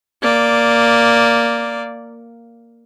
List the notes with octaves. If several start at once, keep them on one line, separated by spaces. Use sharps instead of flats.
A#3 D5